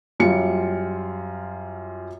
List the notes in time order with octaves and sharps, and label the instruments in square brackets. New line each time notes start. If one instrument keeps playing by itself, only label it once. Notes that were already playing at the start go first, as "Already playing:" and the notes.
[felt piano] F#2 G3 F4 C#7